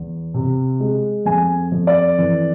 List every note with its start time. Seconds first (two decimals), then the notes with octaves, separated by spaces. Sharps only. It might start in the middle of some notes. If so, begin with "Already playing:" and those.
Already playing: E2
0.34 C3
0.80 G#3
1.26 F2 G#5
1.72 F2
1.87 D5
2.19 E3